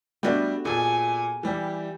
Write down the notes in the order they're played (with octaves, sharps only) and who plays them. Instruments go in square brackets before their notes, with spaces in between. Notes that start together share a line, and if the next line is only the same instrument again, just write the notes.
[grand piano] G3 A3 D4 [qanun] B3 F#4 B4
[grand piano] A#2 [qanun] G#4 A4 [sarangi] G#5
[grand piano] E3 G3 [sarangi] G4